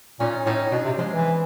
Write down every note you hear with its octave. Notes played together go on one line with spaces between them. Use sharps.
A#2 C#4 D#4
A2 C#4 D#4
B2 C4 D4
C3
F3 G#3
E3